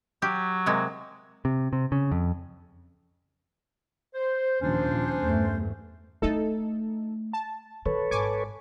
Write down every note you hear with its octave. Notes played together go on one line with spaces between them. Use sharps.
F#3 G4
C3 G#3 A#3
C3
C3
C#3
F2
C5
D#2 A#2 F3 C#4 D4 C5
F3
E2 G2 A3
A3 D#4 E4 A4
A5
D#3 A4 B4 C#5
G#1 G#5 C#6 D6